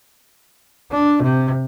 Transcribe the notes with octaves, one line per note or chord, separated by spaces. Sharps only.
D4
C3